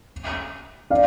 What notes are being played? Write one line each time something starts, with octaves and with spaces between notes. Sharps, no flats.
D5 F5